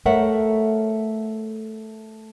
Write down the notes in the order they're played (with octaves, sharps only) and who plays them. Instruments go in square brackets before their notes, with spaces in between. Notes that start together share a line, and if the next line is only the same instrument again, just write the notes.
[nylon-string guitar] A3 A#4 C#5 E5 F#5